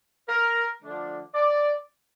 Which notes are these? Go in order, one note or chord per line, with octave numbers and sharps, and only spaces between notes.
A#4
D3 F3 A3 D4
D5